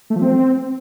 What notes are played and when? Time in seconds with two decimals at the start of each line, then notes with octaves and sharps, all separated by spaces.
0.10 A3
0.16 F3
0.22 C4